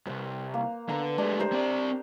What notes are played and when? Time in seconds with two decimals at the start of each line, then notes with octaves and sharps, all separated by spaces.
0.06 C2 F#2 C5 F#5
0.54 A#3
0.89 D3 B3 A#5
1.18 G#3 A3 D4 G4
1.39 G4 A#4 C5
1.53 C4 D5